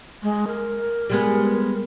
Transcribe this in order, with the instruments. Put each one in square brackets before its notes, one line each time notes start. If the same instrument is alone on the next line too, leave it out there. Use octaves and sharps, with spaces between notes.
[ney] G#3
A#4
[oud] G3 G#3 B3